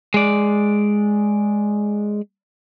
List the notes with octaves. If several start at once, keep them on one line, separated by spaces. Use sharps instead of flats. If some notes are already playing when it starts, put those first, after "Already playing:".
G#3 D5